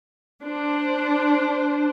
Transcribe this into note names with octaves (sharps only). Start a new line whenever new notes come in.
D4 C5